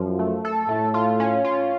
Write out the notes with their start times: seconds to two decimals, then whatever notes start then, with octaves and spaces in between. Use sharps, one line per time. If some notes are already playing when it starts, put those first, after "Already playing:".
Already playing: F#2 F3
0.19 A3
0.45 A4
0.69 A2 A3
0.94 F4
1.20 C#4
1.44 F4